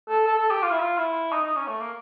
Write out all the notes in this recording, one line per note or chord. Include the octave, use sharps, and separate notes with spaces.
A4
A4
A4
G4
F4
E4
F4
E4
D#4
D#4
C#4
A3
A#3